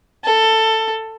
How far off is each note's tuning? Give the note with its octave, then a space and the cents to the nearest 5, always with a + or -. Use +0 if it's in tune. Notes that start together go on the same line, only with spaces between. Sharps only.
A4 +15